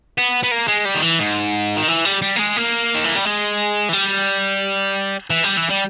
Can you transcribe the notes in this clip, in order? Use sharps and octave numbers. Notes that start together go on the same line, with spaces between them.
B3
B3
A#3
G#3
G3
D#3
E3
G#2
D#3
E3
G3
G3
A#3
G#3
A#3
D#3
E3
G3
G#3
E3
G3
E3
G3
E3
G3